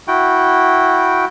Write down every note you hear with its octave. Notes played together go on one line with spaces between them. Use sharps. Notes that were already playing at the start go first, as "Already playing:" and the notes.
E4 F#4 G5